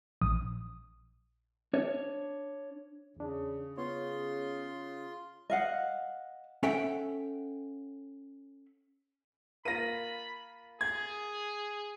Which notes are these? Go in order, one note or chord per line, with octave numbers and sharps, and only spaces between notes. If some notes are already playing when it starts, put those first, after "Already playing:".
A#1 D#6
D4 C#5
E2 C#3 D4
B3 F4 C#5 C6
D#5 F5 F#5
C#4 A4 E5 F#5 G5
A#3 F4 B5 A#6 D#7
G#4 G#6